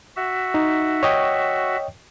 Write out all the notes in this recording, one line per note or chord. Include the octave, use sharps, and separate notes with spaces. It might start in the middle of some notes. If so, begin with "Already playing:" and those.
F#4 E5
D#4
C#5 D#5 G5